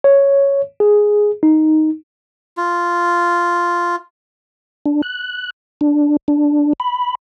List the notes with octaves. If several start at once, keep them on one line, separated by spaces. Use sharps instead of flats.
C#5
G#4
D#4
F4
D4
F#6
D4
D4
B5